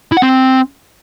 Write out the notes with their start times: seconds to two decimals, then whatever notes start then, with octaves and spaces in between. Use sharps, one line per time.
0.12 E4
0.17 F#5
0.22 C4